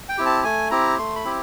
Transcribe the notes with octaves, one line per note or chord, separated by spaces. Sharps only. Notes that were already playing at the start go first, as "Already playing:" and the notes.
G5
C4 E4 G4
A5
A3 G#5
C4 E4 G4 A#5
A3 C6
B5
C4 E4 G4